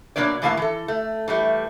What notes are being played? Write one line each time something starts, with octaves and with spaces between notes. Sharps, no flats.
B2 D3 F#3 A#3 D4 D5
A2 E3 A#3 F4 F5 A5
E3 A4
A3
E3 G3 A3